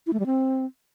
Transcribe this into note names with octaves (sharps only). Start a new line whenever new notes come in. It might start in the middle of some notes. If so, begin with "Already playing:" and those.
E4
A3
G3
C4